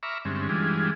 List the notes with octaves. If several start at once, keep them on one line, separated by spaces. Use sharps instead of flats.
E5 A#5 B5 C#6 D6 F6
G2 D3 G#3 C4 C#4
E3 G3 G#3 D4 F4 G#4